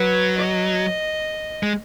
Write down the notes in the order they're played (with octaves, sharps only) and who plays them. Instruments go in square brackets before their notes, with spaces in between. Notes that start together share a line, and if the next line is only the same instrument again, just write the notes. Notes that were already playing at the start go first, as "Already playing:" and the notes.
Already playing: [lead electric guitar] F#3 [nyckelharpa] B4
[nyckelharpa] D#5
[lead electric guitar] G#3